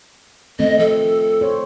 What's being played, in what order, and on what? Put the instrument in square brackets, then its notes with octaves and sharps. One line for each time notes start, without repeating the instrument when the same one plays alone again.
[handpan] D#3 A3 C4 [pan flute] D#5
[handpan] F3 [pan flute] A4
[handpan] C5 C#5